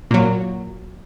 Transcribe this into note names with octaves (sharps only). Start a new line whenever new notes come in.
A#2 F#3